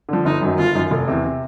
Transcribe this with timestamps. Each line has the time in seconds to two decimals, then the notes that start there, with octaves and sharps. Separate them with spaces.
0.09 D3 F3
0.25 G1 D#4
0.42 F#2 D#3 F#3
0.58 G1 F4
0.75 F#2 D#3
0.91 F1
1.08 E2 C3
1.25 C3